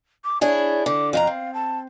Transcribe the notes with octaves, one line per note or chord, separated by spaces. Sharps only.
D6
D4 E4 G#4 C#5
D3 D6
F2 F#4 F5 A#5
C4
A5